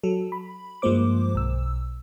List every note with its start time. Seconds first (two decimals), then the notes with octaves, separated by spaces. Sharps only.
0.03 F#3 A4
0.32 B5
0.82 G2 F3 G#3 A#3 C5 D6
1.35 B1 E6